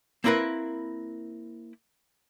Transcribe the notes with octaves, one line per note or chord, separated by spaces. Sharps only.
A#3 C4 E4 A#4 B4